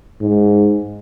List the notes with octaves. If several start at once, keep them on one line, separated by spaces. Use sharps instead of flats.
G#2